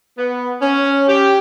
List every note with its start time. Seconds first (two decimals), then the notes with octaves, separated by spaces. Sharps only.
0.18 B3
0.61 C#4
1.08 G4